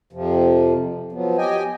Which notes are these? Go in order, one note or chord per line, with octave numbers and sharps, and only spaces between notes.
F2 C3 F3
F3 F#3 B3
G4 D#5 G5 G#5